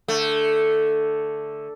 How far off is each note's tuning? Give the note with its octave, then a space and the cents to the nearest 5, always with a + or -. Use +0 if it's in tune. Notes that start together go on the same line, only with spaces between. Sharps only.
D3 +0 A3 +0